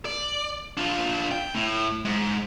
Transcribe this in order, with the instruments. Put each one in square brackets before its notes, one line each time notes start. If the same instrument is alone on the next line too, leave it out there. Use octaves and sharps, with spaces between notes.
[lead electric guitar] D5
D4 F4
G5
A2
G#2